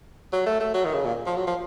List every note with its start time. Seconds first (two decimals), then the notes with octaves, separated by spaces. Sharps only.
0.33 F#3
0.46 A3
0.60 A3
0.74 F#3
0.84 D#3
0.95 C#3
1.05 A#2
1.26 F3
1.36 F#3
1.47 F3